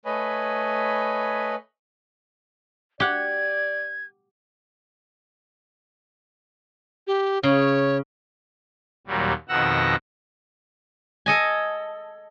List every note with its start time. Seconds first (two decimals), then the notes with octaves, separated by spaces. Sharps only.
0.05 A3 B4 C#5 D#5 G#5 B5
3.00 G4 D5 F#5 G#6
7.07 G4
7.43 C#3 C#5
9.07 D#2 A#2 F#3 G3
9.49 F2 B2 D#3 F#5 E6 A#6
11.26 A4 D#5 G#5